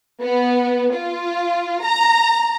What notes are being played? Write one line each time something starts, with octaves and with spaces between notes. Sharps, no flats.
B3
F4
A#5